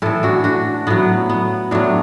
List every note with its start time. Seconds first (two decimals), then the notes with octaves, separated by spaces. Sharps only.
0.02 A2 E3 E4 A4
0.23 D4 F#4
0.44 D4 F#4
0.87 A2 F#3 B3
1.29 B3
1.71 A2 F#3 A3 D4